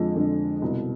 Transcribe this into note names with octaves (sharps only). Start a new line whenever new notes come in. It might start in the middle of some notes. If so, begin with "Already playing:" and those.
Already playing: F2 D3 F3 G#3
F2 D3 F3
C2 B2